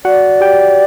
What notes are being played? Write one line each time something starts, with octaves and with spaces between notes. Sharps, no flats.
F#4 D5 F#5
G4 G5